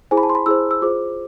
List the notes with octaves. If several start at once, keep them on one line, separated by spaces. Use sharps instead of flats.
E4 G#4 C5 G#5
B5
A5
C6
B5
E4 G#4 C5 E6
E6
F4 G#4 C5 D6